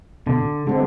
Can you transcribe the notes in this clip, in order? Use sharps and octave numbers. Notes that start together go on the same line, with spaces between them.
B2 D3
D3 G#3 C4